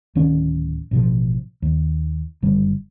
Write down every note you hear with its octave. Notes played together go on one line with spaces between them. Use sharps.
D1 D#3 C#4
A1 B2 F3
D#2
F#1 D3 G3